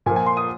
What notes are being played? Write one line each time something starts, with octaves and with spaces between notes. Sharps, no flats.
A#2 F3 A#3 G#5
G#5
C6
D#6